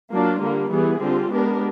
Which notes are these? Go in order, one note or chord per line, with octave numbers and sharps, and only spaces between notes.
F#3 A#3 D4 F4
D3 G3 A#3
E3 G3 B3 E4 G#4
D3 G3 C4 F4
G#3 B3 D4 G4 A#4